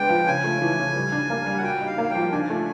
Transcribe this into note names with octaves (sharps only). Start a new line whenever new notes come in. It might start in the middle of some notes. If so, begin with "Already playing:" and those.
Already playing: G#3 B3 D4 G5
F3
C#3 G#5
A3
E3
C#3
G3
D4
A#3
G3
F#5
F#4 G5
D#4
F5
A#3
G5
F3
D4 G#5
A3